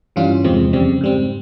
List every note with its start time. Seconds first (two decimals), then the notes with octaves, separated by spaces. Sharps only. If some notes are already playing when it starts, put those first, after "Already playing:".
0.16 G2 E3 G3 C#4 F4
0.44 E2 C3 F3 G#3 C4
0.73 F2 C#3 G3 C4
1.01 G#2 G3 C4